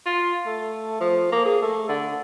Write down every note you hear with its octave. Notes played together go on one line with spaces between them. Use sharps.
F4
A3
F3
A#3
G#4
A3
D3